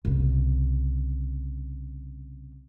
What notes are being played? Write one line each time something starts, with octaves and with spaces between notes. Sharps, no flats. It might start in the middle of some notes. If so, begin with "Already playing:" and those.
C2 C#3